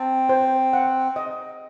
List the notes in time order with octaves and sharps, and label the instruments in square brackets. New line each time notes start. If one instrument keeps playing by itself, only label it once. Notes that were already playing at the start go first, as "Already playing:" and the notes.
Already playing: [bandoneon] C4 [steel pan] A5
[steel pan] C5
F#5
D#5